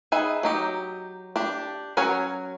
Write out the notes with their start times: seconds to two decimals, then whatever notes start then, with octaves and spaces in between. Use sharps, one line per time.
0.12 D#4 G#4 B4 E5
0.43 F#3 D#4 G4
1.36 D4 G4
1.97 F#3 C#4 F#4 A#4 C#5